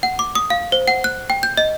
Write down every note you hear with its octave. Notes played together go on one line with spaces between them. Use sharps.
F#5
D6
D#6
F5
C5
F#5
F#6
G5
G6
D#5